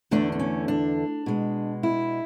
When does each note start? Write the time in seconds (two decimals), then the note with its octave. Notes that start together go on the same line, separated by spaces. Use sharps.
0.11 E2 D3 A3 D4
0.32 D4
0.39 C#4
0.68 D4
1.26 B2 G#3
1.83 E4